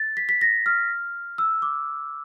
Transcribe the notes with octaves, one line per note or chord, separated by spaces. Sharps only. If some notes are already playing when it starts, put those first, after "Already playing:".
Already playing: A6
B6
B6
A#6
F6
E6
D6